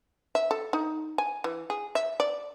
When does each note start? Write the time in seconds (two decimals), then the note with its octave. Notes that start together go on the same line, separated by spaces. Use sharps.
0.35 E5
0.51 A4
0.73 D#4
1.18 G#5
1.44 E3
1.70 G#4
1.95 E5
2.20 D5